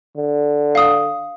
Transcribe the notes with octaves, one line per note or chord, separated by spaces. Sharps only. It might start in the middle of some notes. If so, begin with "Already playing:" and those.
D3
F5 D#6